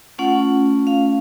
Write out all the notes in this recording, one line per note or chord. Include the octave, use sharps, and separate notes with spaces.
A3 C#4 F4 F#5
F5